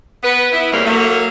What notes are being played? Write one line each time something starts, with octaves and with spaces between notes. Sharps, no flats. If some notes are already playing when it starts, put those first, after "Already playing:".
B3 B4
B3 E4
F2 C#3 E3 G3 A#3
F#3 A3 A#3